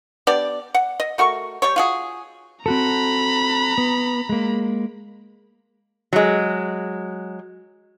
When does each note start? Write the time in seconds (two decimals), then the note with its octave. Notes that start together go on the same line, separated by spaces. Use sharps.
0.27 B3 D4 G4 D5
0.74 F#5
1.00 D#5
1.18 A3 F#4 A#4 C#6
1.62 G3 G4 C#5
1.76 F4 F#4 G#4
2.66 C4 F#4 A4 A#5 B5
3.78 B3
4.29 G#3 A#3
6.13 F#3 G#3